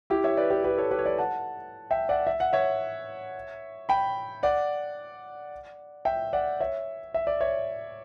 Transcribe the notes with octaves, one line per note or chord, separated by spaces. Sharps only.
E4 G4
C#5 E5
B4 D5
G4 B4
G4 B4
A4 C#5
G4 B4
C#5
B4 D5
F#5 A5
E5 G5
D5 F#5
E5
F#5
C#5 E5
G5 B5
D5 F#5
E5 G5
D5 F#5
C#5 E5
E5
D5
C#5 E5